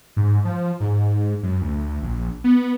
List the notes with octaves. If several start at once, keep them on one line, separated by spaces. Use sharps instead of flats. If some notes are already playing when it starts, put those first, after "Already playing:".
G#2
F3
G#2
F#2
D2
A#1
B3